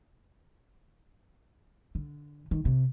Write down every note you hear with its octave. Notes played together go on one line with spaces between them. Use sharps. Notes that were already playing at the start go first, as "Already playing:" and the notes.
D3
D#3
C3